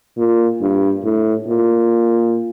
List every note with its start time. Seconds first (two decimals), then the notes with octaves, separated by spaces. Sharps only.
0.17 A#2
0.61 G2
1.04 A2
1.47 A#2